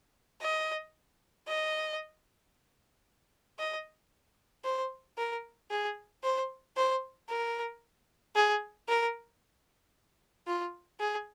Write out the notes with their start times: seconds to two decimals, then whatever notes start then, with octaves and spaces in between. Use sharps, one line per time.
0.41 D#5
1.47 D#5
3.59 D#5
4.64 C5
5.18 A#4
5.71 G#4
6.23 C5
6.77 C5
7.29 A#4
8.36 G#4
8.88 A#4
10.47 F4
11.00 G#4